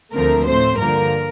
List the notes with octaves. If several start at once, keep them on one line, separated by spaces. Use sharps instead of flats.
D2 D3 F3 A3 C4 A#4
A2 A3 C4 C5
G2 D3 F3 A#3 A#4